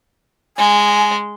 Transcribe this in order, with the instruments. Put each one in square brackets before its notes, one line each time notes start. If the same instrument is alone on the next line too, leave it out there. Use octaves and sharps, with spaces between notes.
[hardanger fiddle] G#3 [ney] G#5